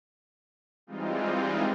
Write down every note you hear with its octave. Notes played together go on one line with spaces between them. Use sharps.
E3 G3 G#3 C4 D#4 F4